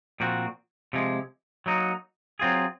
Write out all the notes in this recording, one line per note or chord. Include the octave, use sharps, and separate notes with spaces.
A#2 F3 C4 F#4
C3 F3 G#3
F#3 A#3 D#4 F#4
F#3 C4 F4 G#4